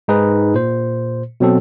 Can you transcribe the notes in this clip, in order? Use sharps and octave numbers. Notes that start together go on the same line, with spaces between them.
G#2 D#4 G#4 B4
A#2 C5
B2 F#3 C4 A4